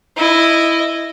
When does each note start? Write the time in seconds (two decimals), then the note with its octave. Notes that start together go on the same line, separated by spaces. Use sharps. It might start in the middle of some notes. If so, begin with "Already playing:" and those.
0.17 E4 D#5